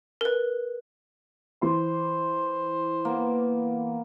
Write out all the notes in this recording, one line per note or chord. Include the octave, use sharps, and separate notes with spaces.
A#4 B4
E3 C5 C6
A#3 B3